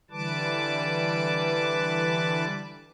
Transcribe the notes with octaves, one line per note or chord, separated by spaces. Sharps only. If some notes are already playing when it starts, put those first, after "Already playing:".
D3 E3 G3 B4 A5 D6